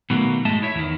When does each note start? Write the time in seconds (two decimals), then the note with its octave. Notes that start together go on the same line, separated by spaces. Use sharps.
0.10 B2 D#3 F#3 A3 A#3
0.45 G#2 G#3 A3 D#5 E5 A5
0.62 E4 C#5 E5
0.75 E2 D#3